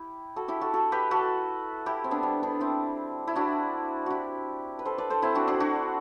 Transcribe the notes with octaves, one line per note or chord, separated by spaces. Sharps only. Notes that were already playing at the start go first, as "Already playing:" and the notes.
Already playing: E4 G4
F#4 A4
E4 G4
F#4 A4
F#4 A4
G4 B4
F#4 A4
E4 G4
C4
B3 D4
G3 B3
B3 D4
C4 E4
E4
D4 F#4
E4 F#4 G4
B4
A4 C5
B4 D5
A4 C5
C4 E4
D4 F#4
D4 F#4
D4 F#4